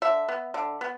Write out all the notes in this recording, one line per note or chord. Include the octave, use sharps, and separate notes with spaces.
D3 E5
B3
D3
B3